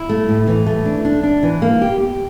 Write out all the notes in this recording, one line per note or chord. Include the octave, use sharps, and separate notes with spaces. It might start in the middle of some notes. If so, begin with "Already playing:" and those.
Already playing: E4
A3
A2
E3
A3
D4
D4
D4
E3
A#3
G4
G4